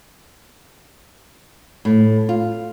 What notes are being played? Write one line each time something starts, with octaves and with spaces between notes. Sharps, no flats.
A2
F4